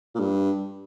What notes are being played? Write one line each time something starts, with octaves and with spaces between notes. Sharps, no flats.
A#2
G2